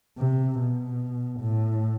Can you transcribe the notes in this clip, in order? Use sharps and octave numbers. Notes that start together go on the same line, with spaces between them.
C3
B2
A2